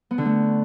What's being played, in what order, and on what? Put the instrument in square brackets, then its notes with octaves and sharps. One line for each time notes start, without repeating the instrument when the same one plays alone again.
[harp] B3
D3
A3